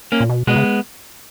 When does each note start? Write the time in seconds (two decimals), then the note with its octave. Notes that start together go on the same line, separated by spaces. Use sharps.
0.12 A#3 C#4
0.20 A#2
0.30 B2
0.47 B2 G#3 B3
0.56 C#3